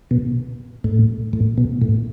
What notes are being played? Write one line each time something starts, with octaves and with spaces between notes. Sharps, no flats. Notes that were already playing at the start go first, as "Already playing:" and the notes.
B2
A2
A2
B2
A2